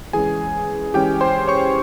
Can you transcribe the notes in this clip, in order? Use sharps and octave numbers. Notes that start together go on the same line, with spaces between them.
E3 G#3 C#4 G#4 G#5
E3 G#3 C#4 G4 G5
C5 C6
C#5 C#6